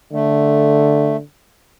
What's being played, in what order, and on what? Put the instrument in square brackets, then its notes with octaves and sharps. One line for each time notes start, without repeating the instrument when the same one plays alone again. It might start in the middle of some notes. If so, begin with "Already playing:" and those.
[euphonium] D3 [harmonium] A3